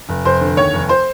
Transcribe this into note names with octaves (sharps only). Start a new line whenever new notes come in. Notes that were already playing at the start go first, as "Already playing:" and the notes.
F1
F1 C5
D3
D#2 C#5
F1
C5